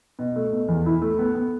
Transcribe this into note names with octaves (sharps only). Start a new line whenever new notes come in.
B2
A3
B2
E2
E4
A3
B3
B3